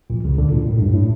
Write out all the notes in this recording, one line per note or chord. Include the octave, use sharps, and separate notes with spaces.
A#1 A#2
C#2 C#3
D2 D3
A#1 A#2
A2
G2
A2